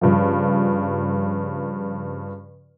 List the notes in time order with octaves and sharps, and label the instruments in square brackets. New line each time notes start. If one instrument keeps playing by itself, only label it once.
[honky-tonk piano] G2 C#3 F3